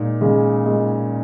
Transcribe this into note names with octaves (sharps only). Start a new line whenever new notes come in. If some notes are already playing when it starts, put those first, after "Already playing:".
Already playing: A#2 G#3 D#4
C#3 G#3
G#3